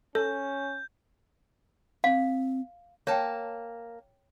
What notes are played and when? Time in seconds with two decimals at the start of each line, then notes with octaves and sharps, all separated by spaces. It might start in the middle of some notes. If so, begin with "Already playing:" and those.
0.15 C#4 A4 G6
2.04 C4 F5
3.07 A#3 C#5 G5 A5